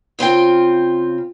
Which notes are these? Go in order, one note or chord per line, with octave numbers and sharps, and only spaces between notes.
C#3 C4 F4 G5